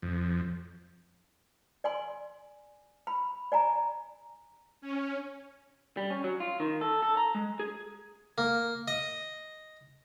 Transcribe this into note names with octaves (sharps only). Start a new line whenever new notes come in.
F2
D5 G#5 C6
B5
D5 G#5 A#5
C#4
G3
C#4
F#3
F4
D#3
A4
A4
A#5
G#3
G#4
A#3
D#5